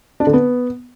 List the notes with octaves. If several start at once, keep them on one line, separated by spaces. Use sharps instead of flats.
D4
D3
B3